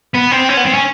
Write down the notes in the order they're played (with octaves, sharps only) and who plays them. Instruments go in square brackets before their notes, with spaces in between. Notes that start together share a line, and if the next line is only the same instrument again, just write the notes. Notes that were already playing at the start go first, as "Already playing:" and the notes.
[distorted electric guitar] B3
C4
C#4
B3
C4
C#4